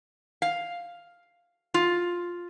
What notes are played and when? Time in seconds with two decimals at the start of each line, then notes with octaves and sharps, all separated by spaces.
0.42 F5
1.74 F4